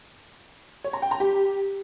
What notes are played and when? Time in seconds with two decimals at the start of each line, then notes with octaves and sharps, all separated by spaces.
0.84 C#5
0.93 A#5
1.02 G5
1.11 A#5
1.20 G4